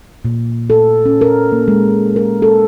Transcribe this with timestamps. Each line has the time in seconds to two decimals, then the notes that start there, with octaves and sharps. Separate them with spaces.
0.25 A#2
0.70 A4
1.05 C#4
1.21 A#4
1.52 A#3
1.68 G#3
2.16 A#4
2.42 A4